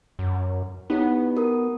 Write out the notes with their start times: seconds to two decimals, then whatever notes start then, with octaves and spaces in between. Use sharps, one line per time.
0.19 F#2
0.90 B3 D#4 E4 G4 C#5
1.35 F#4 A#4 D#6